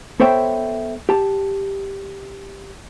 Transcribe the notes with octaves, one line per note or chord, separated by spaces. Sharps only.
B3 A4 C5 C#5 E5 G5
G4 A5